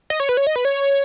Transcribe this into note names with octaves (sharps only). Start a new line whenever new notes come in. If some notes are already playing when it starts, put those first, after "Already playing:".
D#5
C#5
B4
C#5
D#5
B4
C#5